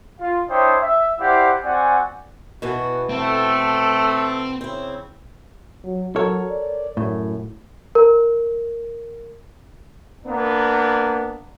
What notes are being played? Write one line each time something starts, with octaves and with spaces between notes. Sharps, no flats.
F4 F5
D4 E4 C5 C#5 D#5 G5
E5
E4 G4 C5 D5 F5 F#5
C4 F#4 D5 F#5 G#5
B2 E3 B3 F#4
A3 C4 A4
C#3 C4 E4
F#3
F#3 A4 A#4 C#5
D5
F#2 A2
A#4
A#3 B3 D4